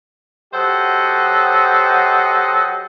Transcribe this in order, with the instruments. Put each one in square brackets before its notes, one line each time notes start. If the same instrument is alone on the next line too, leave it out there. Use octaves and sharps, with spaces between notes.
[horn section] F#3 G4 A4 C5 D#5 F#5